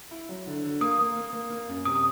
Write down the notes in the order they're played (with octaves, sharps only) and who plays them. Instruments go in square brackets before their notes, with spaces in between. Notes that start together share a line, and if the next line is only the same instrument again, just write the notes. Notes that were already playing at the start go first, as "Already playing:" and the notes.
[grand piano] E4
F#3
D3
D3
[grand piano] A#3 [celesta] D#6
[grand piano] A#3
A#3
A#3
A#3
F#2
[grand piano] C3 [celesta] D#6